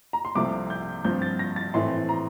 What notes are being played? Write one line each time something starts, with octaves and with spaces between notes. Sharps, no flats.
A#5
C6
C2 C3 F3 A3 C4 D6
G6
G2 F3 C4 G6
A6
A#6
A6
A2 E3 A3 C4 C6
A#5